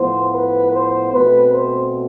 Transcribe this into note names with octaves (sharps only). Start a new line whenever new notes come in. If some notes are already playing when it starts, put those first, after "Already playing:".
Already playing: A2 F3 B3 C5
B4
C5
B2 A3 C4 B4
C5